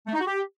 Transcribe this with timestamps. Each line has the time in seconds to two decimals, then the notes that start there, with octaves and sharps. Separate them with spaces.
0.07 A3
0.14 D#4
0.20 F#4
0.27 G4